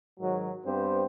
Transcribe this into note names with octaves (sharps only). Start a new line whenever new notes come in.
G#2 D#3 F#3
G2 B3 C4 G4 C5